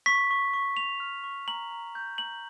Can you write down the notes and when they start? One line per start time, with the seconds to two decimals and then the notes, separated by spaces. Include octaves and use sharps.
0.06 C#6 B6
0.31 C#6
0.54 C#6
0.77 C#6 F7
1.00 F6
1.24 C#6
1.48 A#5 F#7
1.71 A#5
1.95 G6
2.18 A#5 F#7